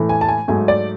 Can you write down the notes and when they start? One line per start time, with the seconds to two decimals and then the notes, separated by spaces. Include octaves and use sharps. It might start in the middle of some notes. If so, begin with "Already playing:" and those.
Already playing: A2 E3 A3
0.09 G#5
0.21 A5
0.28 G#5
0.48 G#2 F#3 A3 G#5
0.68 D5